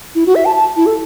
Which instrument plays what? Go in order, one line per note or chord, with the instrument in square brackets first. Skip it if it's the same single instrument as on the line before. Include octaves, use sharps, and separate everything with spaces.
[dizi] E4
F#4
E5
A5
A5
E4
A4